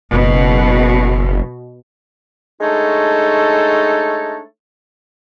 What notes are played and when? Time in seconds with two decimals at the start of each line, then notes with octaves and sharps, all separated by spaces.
0.13 F#1 B2
2.61 G#3 A3 D4 D#4 A4 C#5